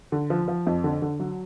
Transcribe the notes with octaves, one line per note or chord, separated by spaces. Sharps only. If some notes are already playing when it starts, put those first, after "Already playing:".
D3
F3
F3
F2
D3
D3
F#3